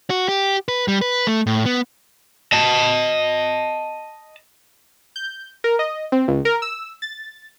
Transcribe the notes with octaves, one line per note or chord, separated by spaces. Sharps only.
F#4
G4
B4
G3
B4
A3
A2
B3
D#5 A5
G6
A#4
D#5
C4
C#2
A#4
E6
A6